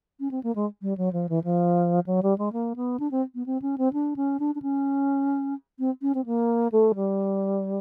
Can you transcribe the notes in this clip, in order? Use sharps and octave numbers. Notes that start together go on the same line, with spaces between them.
C#4
C4
A#3
G#3
G3
F#3
F3
E3
F3
F#3
G3
G#3
A#3
B3
D4
C4
B3
C4
C#4
C4
D4
C#4
D4
D4
C#4
C4
C#4
C4
A#3
A3
G3